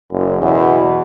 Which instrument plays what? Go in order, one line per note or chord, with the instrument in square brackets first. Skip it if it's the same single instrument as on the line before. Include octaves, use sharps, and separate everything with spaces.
[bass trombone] F#1 [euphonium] F#2
[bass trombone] E2 [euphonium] B2